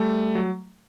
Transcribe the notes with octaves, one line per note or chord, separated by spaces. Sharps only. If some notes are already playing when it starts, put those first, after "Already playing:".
Already playing: G3 A3
F#3